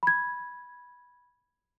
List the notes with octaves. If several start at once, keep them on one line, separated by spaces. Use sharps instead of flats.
B5 G#6